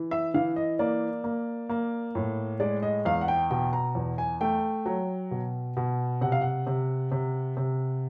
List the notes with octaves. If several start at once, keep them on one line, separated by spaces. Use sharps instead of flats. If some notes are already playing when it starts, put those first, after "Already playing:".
Already playing: E3
E5
E3 F5
D#5
A#3 D5
A#3
A#3
A2
G#3 D5
D#5
E2 F5
F#5
G5
B2 G5
A#5
E2
G#5
A3 G5
F#3
B2
B2
C3 F#5
F5
F#5
C3
C3
C3